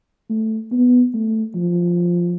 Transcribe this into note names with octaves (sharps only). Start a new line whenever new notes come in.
A3
B3
A3
F3